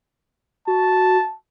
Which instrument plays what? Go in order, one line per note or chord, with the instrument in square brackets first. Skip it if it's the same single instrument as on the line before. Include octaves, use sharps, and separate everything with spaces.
[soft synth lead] F#4 [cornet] A5